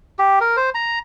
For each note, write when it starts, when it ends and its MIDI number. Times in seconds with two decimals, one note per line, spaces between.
0.19 0.39 67
0.41 0.56 70
0.57 0.70 72
0.75 0.99 82